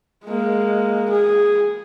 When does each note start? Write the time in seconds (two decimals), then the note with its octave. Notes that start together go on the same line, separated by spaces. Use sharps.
0.24 G#3 A#3
1.10 G#4